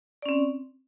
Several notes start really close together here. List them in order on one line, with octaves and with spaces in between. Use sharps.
D5 C#4 C4